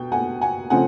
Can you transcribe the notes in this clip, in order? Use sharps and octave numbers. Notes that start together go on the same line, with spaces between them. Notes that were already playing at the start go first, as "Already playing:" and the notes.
Already playing: B2 G5
F#5 G#5
F#5 G#5
C#3 F3 A3 C4 F#5 G#5